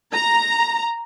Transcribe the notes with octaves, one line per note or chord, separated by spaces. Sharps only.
A#5